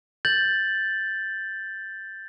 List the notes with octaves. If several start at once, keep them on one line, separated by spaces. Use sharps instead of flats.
G6 A6 F#7